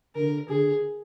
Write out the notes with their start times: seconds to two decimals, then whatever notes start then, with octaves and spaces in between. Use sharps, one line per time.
0.15 D3 A#4
0.49 D3 G#4